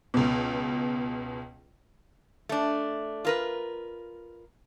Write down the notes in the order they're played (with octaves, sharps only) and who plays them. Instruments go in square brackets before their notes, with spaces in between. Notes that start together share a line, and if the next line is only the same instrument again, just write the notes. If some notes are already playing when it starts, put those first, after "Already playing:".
[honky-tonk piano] C#2 B2
[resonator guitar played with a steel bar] A3 D4
F4 A#4 B4